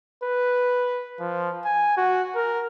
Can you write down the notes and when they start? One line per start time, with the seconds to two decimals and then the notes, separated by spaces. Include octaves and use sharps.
0.24 B4
1.20 F3
1.65 G#5
1.97 F#4
2.36 A#4